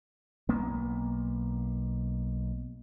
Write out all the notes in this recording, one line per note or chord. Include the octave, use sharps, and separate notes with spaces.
B1 A#3 B3